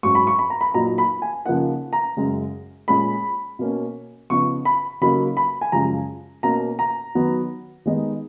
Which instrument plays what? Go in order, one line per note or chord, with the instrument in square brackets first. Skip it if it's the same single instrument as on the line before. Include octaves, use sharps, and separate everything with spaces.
[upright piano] G#2 F#3 C#4 C#6
B5
C#6
B5
A#5
B5
A#2 F#3 A#3 D#4 A#5
B5
G#5
C#3 F3 A#3 D#4 F#5
A#5
F#2 C#3 G#3
A#2 G#3 C#4 B5
B2 A#3 C#4
C#3 F3 B3 D#4 C#6
B5
C#3 F#3 A#3 D#4 B5
B5
G#5
F#2 C#3 F3 G#3 A#5
B2 A#3 C#4 A#5
A#5
D#3 F#3 B3 D#4
D#3 G#3 B3 D#4